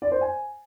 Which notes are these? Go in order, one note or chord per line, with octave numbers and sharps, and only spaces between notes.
D5
C5
G#5